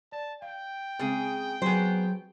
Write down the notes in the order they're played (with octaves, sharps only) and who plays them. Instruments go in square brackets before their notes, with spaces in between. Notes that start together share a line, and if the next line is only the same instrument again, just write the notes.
[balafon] D5 [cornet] A5
[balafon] F5 [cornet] G5
[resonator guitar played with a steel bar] C#3 G#4 [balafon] G#3 C4
[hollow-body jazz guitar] F#3 G#4 [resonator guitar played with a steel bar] B3 C5